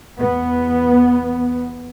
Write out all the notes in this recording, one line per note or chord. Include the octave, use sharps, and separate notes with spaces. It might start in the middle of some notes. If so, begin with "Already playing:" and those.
E2 B3